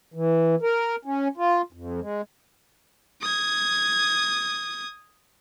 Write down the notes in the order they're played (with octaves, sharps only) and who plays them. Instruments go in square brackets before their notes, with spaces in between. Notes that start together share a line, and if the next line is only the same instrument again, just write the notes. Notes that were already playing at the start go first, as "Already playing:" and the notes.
[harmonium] E3
A#4
C#4
F4
F2
G#3
[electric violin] D#6 G#6